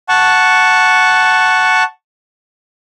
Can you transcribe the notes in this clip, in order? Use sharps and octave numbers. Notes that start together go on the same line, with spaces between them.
F#5 A5 C#6